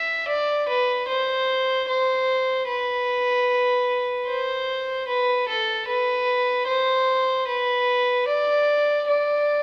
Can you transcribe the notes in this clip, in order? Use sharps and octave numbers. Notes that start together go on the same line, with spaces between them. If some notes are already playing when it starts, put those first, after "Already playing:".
Already playing: E5
D5
B4
C5
C5
B4
C5
B4
A4
B4
C5
B4
D5
D5